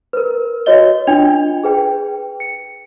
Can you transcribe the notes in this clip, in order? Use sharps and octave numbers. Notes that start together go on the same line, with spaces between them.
A#4 B4
F#4 B4 C#5 D#5 G7
D4 F4 G5 G#6 F7
G#4 B4 G5
C#7